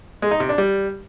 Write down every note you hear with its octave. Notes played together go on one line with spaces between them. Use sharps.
G#3
D#4
C3
D4
G3